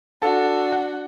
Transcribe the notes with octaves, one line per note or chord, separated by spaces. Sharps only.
D4 F#4 A4 A5
F#5